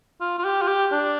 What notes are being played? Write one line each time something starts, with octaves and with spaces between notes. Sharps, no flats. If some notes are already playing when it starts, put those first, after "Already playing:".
F4
F4
G4
F4
G4
D4